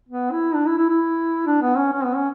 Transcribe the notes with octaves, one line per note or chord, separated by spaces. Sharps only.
B3
E4
D4
E4
E4
E4
D4
B3
C#4
C#4
B3
C#4